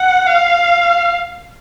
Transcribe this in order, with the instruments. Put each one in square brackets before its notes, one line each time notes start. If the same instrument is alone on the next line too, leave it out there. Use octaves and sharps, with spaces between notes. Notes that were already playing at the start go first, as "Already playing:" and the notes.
Already playing: [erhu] F#5
F5